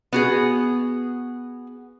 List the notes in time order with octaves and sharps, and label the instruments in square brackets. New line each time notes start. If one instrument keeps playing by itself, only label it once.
[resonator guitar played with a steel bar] B3 F#4 G#4